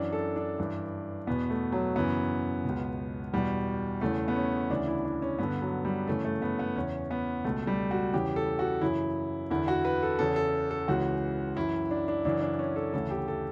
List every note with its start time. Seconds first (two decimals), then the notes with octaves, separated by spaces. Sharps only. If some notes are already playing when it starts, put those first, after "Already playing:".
Already playing: F#2 E3 D4
0.13 A4
0.36 D4
0.58 G2 E3
1.27 E2 B2 B3
1.50 A3
1.72 F#3
1.96 F#2 C#3 E3 B3
2.65 C#2 B2
3.33 E2 B2 G3
4.01 E2 C#3 E3 A3
4.28 B3
4.36 C#4
4.70 D2 C#3 E3 D4
4.88 E4
5.05 D4
5.22 C#4
5.39 G2 D3 B3
5.62 F#3
5.85 G3
6.07 F#2 C#3 E3 A3
6.25 A3
6.42 B3
6.59 B3
6.76 E2 C#3 E3 C#4
7.11 B3
7.44 C#2 B2 A3
7.67 G3
7.91 F#4
8.13 E2 C#3 E3 G4
8.36 A4
8.59 F#4
8.81 F#2 C#3 E3 E4
9.50 E2 D3 E4
9.68 F#4
9.85 B4
10.03 A4
10.19 E2 C#3 E3 A4
10.36 A4
10.71 A4
10.88 C#2 C#3 E3 F#4
11.56 F#2 E3 E4
11.91 D4
12.08 D4
12.25 F#2 C#3 E3 D4
12.42 D4
12.59 C#4
12.76 A4
12.94 D2 C#3 E3 A4
13.11 G4
13.28 A4